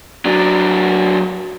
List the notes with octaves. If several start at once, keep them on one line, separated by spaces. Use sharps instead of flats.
F#3 D4